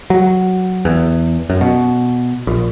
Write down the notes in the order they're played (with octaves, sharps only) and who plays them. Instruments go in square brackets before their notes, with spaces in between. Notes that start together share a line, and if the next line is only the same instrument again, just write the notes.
[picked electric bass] F#3
E2
F#2
B2
A#1